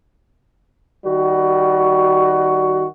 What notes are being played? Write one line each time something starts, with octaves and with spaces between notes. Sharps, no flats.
D#3 G3 F#4